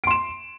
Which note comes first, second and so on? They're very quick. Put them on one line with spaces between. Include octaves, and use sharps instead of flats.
D7 C6 E7